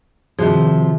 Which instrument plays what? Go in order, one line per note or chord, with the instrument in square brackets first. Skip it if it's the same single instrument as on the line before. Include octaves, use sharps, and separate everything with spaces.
[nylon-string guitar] C3 F3 [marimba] D#3 F#4 G#4